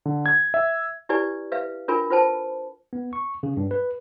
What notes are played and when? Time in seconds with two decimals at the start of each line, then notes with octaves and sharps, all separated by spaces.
0.05 D3
0.26 G#6
0.54 E5
1.09 E4 G4 B4 D5 G#5
1.52 B4 E5 F5
1.88 D4 F4 A#4 G#5 B5
2.10 F4 B4 C5 G5 A5
2.93 B3
3.13 C#6
3.43 C#3
3.57 G2
3.71 B4